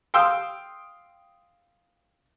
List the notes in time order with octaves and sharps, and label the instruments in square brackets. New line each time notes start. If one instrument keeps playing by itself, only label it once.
[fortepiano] F5 G5 C6 D#6 E6